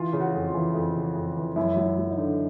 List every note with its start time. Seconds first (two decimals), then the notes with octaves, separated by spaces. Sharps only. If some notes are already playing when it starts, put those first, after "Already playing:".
Already playing: E3 F4
0.13 C#3
0.21 F#4
0.34 F2
0.48 F4
0.54 E3
0.75 F2
0.96 C#3
1.15 F2
1.37 E3
1.56 F#2 E4
1.76 F#3
1.84 E4
1.98 F#3
2.11 D#4
2.17 D3